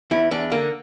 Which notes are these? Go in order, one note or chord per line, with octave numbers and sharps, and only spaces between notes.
E2 E4
E2 D4
D3 A#3